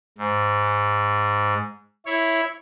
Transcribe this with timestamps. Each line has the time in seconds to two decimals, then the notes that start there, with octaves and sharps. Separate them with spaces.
0.18 G#2
2.06 E4 C#5